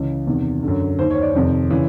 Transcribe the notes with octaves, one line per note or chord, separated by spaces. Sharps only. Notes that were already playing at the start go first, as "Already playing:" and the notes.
Already playing: C#2 C#3 E3
E2 C3 D#3
F#2 D3
D#2 D#3 C5
C#5
D5
F2 C3 D#3
C#3 E3